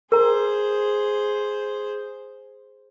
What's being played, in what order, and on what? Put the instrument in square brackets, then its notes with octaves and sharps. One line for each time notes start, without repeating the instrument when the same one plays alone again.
[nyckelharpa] G#4 C5 [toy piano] A#4 A#5